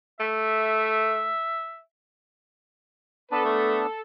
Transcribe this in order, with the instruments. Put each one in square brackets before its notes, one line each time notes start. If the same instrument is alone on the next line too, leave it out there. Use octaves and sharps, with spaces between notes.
[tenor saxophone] A3 [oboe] E5
[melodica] B3 D4 [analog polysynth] A4 [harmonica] B4
[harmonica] A3